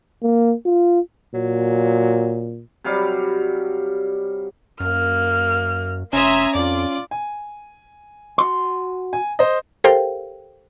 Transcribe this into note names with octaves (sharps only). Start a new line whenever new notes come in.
A#3
F4
A#2 F#3
C3 F#3 G3 F5
F#2 A#3 F6
F1 C#4 E5 A#5 C6 D#6 G#6
F2 F4 D5
G#5
F#4 C6
G#5
C5 D#5
G4 A4 A#4 C5 F5 G5